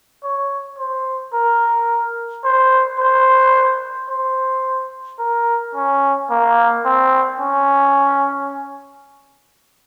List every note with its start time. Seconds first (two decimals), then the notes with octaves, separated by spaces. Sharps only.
0.24 C#5
0.79 C5
1.34 A#4
2.44 C5
2.99 C5
4.09 C5
5.19 A#4
5.75 C#4
6.30 A#3
6.85 C4
7.40 C#4